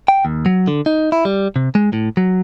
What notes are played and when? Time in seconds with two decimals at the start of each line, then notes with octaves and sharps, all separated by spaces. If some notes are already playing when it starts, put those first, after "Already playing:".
0.08 G5
0.25 D#2
0.46 F#3
0.68 D3
0.86 D#4
1.12 E4
1.25 G3
1.56 C3
1.75 G#3
1.93 A2
2.17 F#3